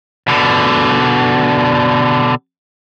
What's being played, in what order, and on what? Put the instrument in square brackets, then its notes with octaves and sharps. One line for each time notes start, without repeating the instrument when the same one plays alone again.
[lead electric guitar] B2 D3